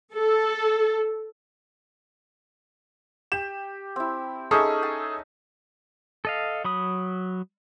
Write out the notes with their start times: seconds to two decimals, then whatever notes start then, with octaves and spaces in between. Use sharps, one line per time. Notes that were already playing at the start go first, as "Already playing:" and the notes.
0.13 A4
3.32 G4 E7
3.96 C4 E4
4.51 C#4 D#4 G#4 A4 E5 D#6
4.83 G#5 A5
6.25 A4 D#5 F5
6.64 F#3 B5 D#6